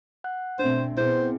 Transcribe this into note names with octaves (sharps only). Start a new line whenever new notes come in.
F#5 F#6
B2 A3 C4 D4 C5 E5
B2 B3 C4 E4 G#4 C5